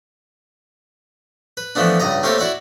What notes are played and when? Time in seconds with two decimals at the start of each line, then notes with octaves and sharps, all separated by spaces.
1.57 B4
1.75 E3 F3 A3 B3 D4
2.00 C#2 G2 D#5 A#5
2.23 A3 A#3 C4 F4 G4 C#5
2.38 E4 F#4 D5 E5